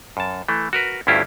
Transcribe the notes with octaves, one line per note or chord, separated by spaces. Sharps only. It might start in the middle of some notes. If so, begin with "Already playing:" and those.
F#2 A5
E3 A3
F#4 A#4 B4
D2 G2 C#4 E4 F4 G4